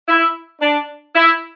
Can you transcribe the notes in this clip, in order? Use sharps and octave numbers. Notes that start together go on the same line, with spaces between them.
E4
D4
E4